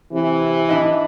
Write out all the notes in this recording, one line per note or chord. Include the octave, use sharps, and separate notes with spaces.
C3 E3
D4 E4 D#5